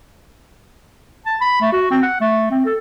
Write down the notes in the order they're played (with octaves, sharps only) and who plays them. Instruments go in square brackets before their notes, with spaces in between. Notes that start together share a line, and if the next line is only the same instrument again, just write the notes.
[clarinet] A5
B5
A3
F#4
C4
F#5
A3
C4
A4